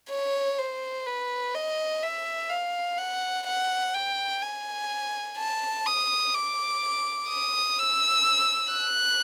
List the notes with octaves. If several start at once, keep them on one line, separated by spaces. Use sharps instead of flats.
C#5
C5
B4
D#5
E5
F5
F#5
F#5
G5
G#5
A5
D#6
D6
D#6
E6
F#6